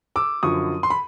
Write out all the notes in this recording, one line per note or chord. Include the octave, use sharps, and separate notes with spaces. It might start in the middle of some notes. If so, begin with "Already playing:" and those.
D6 E6
F#2 D3 F3 C#6 D#6
C6
B5